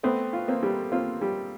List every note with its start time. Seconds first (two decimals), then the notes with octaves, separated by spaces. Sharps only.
0.03 A3 B3 C4
0.33 F4
0.48 A#3 C4
0.63 G3
0.92 A#3 C4 F4
1.21 G3